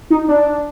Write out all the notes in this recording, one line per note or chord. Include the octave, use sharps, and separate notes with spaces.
D#4
D4